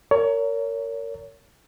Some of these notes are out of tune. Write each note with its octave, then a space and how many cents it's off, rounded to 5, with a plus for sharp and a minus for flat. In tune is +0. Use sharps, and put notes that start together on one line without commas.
A#4 -20 C#5 +25